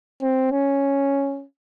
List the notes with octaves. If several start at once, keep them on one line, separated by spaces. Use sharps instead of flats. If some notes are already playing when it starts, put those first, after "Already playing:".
C4
C#4